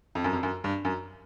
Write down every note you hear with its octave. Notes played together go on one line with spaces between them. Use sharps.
F2
F#2
F2
F#2
G2
F#2